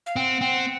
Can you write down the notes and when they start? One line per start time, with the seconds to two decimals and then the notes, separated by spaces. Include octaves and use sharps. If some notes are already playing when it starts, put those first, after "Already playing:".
0.06 F5
0.16 C4 F#5
0.41 C4